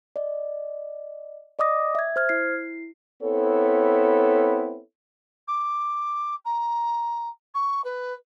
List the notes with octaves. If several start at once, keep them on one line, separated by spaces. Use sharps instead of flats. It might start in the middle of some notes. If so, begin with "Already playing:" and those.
D5 D#5
D5 D#5 D6 D#6 A#6
E5 G#6
C5 F6 G#6
E4 C7
B3 C4 E4 A4 C#5
D6
A#5
C#6
B4